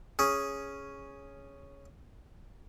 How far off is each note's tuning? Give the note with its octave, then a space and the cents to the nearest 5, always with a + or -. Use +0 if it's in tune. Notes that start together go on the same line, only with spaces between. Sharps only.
C#4 +0 G#4 +0